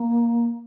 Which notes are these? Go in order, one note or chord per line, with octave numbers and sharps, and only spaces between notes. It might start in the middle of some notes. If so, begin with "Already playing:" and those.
Already playing: A#3